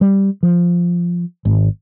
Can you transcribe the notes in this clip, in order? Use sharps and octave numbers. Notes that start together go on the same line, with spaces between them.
G3
F3
G#1